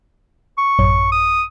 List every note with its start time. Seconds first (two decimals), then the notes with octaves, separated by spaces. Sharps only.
0.58 C#6
0.79 A1 F#2 C#5
1.12 D#6